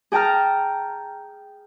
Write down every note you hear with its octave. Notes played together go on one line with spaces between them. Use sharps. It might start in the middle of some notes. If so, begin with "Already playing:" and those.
G#4 G5 A5 A#5 F6